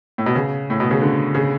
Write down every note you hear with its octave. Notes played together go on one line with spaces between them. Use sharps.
A2
B2
C#3
A2
B2
C#3
D3
C#3